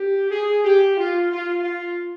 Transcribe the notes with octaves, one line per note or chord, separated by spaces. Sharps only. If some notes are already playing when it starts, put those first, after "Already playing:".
Already playing: G4
G#4
G4
F4
F4
F4